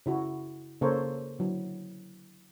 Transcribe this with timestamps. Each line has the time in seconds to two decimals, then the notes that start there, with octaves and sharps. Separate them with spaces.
0.06 C#3 E4 F#4
0.81 C#3 A#3 A4 A#4 C5 C#5
1.39 D3 F#3 E4